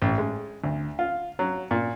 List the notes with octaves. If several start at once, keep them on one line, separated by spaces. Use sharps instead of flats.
A1
G#3
D2
F4
F#3
A#2